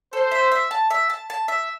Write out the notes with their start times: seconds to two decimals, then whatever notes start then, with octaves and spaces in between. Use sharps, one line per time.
0.13 A4 C5
0.32 E5
0.52 E5
0.71 A5
0.90 E5
1.10 A5
1.30 A5
1.48 E5